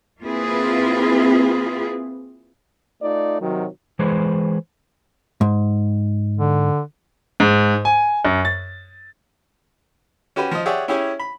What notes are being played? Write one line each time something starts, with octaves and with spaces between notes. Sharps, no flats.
A#3 C4 E4 F4 G#4 B4
A3 D#4 F4 D5
C3 D#3 F#3
E3 G#3 G#4 B4 C5
G#2
D3
G#2
G#5
F#2
A6
C#4 F#4 G4 B4
F3 D#5
G4 G#4 C#5 D5 E5 F#5
C#4 E4 G4 G#4 C#5
B5